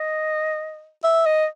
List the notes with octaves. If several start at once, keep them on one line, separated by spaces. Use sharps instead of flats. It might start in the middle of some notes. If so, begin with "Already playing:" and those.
Already playing: D#5
E5
D#5